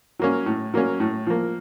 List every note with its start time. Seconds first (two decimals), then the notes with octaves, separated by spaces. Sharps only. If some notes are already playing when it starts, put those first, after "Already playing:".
0.19 F#3 A#3 C#4
0.46 A2
0.74 F#3 A#3 C#4
1.00 A2
1.27 F3 A#3